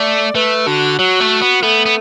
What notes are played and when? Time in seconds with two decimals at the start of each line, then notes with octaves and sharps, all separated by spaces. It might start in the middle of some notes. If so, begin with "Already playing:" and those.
Already playing: A3 D5
0.35 A3 B4
0.67 D3 F#4
0.99 F#3 F#4
1.20 A3
1.42 B3
1.63 A3 B3
1.86 B3